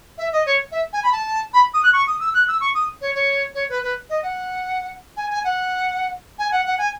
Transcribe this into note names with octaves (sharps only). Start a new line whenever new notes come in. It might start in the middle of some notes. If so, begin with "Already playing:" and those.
E5
D#5
C#5
E5
G#5
B5
A5
B5
D#6
F#6
C#6
D#6
E6
F#6
E6
C#6
D#6
C#5
C#5
C#5
B4
B4
D#5
F#5
G#5
G#5
F#5
G#5
F#5
F#5
G#5